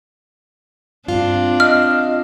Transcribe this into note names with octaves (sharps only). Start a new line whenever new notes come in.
G2 C4 D4 F4
D#5 F6